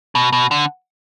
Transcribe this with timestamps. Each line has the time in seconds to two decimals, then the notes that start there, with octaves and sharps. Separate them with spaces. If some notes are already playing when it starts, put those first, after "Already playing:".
0.15 B2
0.33 B2
0.51 D3